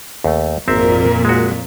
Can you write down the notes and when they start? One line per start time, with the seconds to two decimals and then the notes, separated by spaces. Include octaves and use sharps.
0.24 D#2 A3
0.68 G#1 F2 A#2 C4 A#4 E5
1.25 G#3 F#4